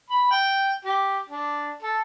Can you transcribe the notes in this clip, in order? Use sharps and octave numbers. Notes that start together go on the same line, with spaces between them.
B5
G5
G4
D4
A4